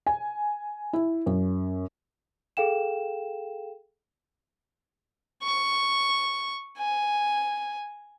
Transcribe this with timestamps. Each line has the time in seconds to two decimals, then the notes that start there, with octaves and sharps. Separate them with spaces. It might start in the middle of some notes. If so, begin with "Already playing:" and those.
0.07 G#5
0.93 E4
1.26 F#2
2.57 G#4 A4 F5 G5 E7
5.42 C#6
6.78 G#5